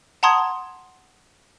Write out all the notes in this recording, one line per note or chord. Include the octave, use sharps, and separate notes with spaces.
F#5 A5 A#5 C6 D#6 G#6